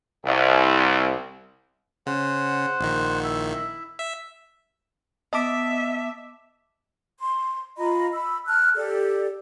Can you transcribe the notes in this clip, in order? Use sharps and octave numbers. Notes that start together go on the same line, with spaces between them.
C2
C#3 C5 F#5
A#1 D#3
E4 E5
E5
B3 D#5 E5 A5 D6
C6
F4 D#5 A#5 B5
B5 E6
A5 F6 F#6
G4 A4 D5